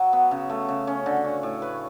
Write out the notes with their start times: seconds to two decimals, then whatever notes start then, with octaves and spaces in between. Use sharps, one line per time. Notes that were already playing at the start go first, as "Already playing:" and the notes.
Already playing: F#3 F#4
0.13 B3
0.31 C#3
0.49 A3
0.69 C#3
0.87 C#4
1.06 D3
1.24 C#4
1.43 A2
1.62 B4